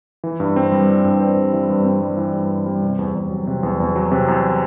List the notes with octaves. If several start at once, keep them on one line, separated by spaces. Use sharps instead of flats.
E3
G2
C4
G3
E3
G2
C4
G3
E3
G2
C4
G3
E3
G2
C4
G3
C3
E2
E2
F#3
C3
E2
E2
F#3
C3
E2